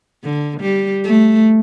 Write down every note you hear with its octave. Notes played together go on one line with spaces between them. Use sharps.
D3
G3
A3